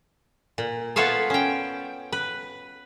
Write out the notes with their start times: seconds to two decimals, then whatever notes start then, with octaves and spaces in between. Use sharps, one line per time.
0.58 A#2
0.96 B3 F4 A4 C#5 E5 F5
1.30 C#4 G5
2.12 B4